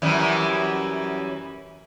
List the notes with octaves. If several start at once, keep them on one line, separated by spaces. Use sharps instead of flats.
F#2 E3 G3